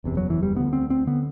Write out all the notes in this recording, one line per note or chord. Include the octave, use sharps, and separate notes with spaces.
F#1 E2 C3
F#3
E3
G3
D2 D3 B3
C4
C4
D3 B3